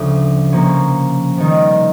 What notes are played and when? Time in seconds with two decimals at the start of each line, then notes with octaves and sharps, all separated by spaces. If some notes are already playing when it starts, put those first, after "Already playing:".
Already playing: D2 C#3 F3
0.52 C3 F3 A#3 C#4
1.38 C3 D#3 G3